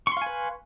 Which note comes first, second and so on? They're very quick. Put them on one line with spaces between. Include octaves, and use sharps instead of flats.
C#6 C6 F5 G#5 B4